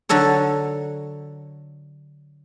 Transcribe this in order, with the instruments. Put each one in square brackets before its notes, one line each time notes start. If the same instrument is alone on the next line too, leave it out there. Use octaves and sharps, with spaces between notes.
[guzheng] D3 F#3 D4 A4 C#5